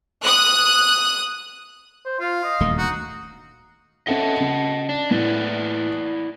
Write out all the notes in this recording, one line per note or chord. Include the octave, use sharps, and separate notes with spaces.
D#6 F#6
C5
F4 F5
D#5
D#1 D2 A3
D#4 F#4
C#4 A4 D#5 E5 F#5 A5
C#3
D4
A2 E4 B4 D5